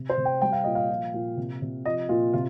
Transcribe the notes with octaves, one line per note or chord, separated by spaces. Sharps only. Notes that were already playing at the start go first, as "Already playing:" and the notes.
Already playing: C3
C5
C3
G5
G3 G5
F5
A#2 D#5
F5
F3
A#2
C3
C3
F3 D#5
A#2 F4
C3 F4